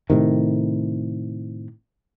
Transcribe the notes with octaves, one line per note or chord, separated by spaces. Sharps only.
A2 C3 D#3